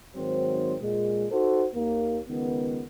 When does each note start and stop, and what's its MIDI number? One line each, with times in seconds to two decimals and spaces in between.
0.16 0.75 44
0.16 0.75 51
0.16 0.75 54
0.16 0.75 60
0.16 0.75 72
0.81 1.26 46
0.81 1.26 56
1.31 1.66 63
1.31 1.66 66
1.31 1.66 69
1.31 1.66 72
1.75 2.20 39
1.75 2.20 58
2.29 2.83 37
2.29 2.83 51
2.29 2.83 59